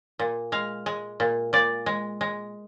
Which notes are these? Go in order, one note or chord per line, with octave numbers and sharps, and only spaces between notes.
A#2
G#3 F5
G#3
A#2
A#2 D5
G#3
G#3